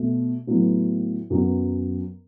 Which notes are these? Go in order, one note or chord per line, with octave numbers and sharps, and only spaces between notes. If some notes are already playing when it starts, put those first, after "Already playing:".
Already playing: B2 A3
A2 F#3 B3
F#2 F#3 B3